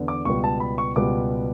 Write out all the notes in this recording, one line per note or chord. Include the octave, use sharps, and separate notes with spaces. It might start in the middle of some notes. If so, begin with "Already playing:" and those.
Already playing: E2 D3 B3
D6
C#2 B2 G3 B3 C#6
A5
B5
C#6
C#2 B2 G3 B3 D6